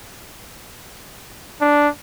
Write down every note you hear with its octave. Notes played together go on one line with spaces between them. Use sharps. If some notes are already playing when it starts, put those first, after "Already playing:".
D4